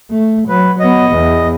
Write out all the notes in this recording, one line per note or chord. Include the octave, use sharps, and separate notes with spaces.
A3
F#3 B4
F#3 B3 D#5
E2